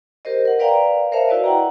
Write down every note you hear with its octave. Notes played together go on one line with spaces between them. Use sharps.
G4 A#4 C5 D#5
A#4 F#5
B4 D5 F5 G5 A#5
A#4 C5 C#5 E5 F5 A5
E4 F#4 B4 D5 D#5
F#5 G5 A#5